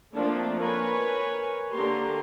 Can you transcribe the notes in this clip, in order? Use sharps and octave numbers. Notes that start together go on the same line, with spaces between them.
F3 A3 A#3 C4 D4
A#4 B4 C#5 G#5
D3 A#3 G4 A#5 C6